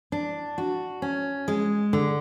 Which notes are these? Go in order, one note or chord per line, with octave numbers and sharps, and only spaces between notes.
D4
F#4
C#4
G#3
D3